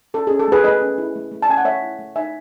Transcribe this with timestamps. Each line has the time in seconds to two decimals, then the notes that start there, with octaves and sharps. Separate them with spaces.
0.14 C#4 A4
0.27 C#4 G#4
0.39 A4
0.48 A3 G#4 B4
0.64 A3 B4 D#5
0.82 C#4
0.98 E4
1.16 A3
1.31 A3
1.42 A5
1.49 C#4 G#5
1.57 F#5
1.65 A3 C#5 E5
1.82 E4
1.99 A3
2.16 D#4 E5 G#5